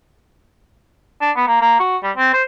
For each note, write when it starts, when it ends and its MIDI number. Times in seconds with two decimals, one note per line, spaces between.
1.21 1.31 62
1.36 1.44 59
1.48 1.59 58
1.61 1.76 58
1.80 1.97 66
2.04 2.12 55
2.17 2.32 60
2.33 2.43 72